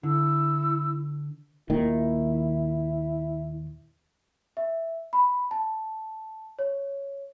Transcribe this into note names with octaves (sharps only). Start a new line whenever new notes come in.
D3 E4 E6
D#2 A#2 D#3 E4
E5
B5
A5
C#5